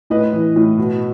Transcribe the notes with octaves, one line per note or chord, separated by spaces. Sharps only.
A2 B4 D#5
E3
A2
B2